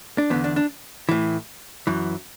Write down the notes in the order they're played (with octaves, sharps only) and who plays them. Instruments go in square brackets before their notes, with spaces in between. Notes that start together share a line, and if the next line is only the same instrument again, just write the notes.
[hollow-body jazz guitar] D4
E2 D3 B3
D4
D4
A2 E3
F#2 E3